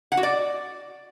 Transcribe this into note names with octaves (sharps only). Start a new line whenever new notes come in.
F#5
F#4
D5